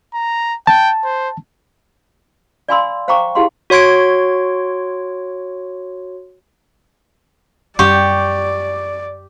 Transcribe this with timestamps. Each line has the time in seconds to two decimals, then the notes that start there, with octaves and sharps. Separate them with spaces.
0.14 A#5
0.67 G5 A5
1.04 C5
2.68 D5 F5 G#5 B5 C6 E6
3.08 C5 F5 G5 A#5 C#6 D6
3.35 E4 G4 G#4 F5 F#5 C6
3.70 F#4 C#5 C6 G#6 D7
7.79 F#2 G3 G4 D5 C#6